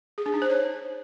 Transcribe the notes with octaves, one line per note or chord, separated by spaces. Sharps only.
G#4
D4
D#4
C5
C#5